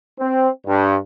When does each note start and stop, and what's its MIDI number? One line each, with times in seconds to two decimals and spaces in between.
0.19 0.49 60
0.67 0.97 43